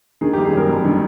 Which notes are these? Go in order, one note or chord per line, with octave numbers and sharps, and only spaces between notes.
D#3 G#4
G4
G1
G#4
F#2 A#4
G1
D#3